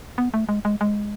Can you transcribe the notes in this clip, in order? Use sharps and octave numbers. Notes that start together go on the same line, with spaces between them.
B3
A3
G#3
G#3
G#3